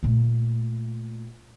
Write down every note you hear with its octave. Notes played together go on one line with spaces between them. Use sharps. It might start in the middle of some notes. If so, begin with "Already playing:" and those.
A#2 A3